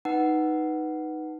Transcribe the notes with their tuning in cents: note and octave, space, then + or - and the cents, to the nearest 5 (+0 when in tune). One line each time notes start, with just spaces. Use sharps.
D#4 +0 B4 +0 F#5 +10